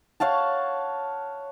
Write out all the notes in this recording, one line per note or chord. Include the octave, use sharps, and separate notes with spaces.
C#5 F5 F#5 A5